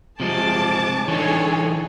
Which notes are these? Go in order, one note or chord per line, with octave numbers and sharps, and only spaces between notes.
C3 F3 G#3 G#4 A5 D6
E3 D4 D#4 G#4 A4 C#5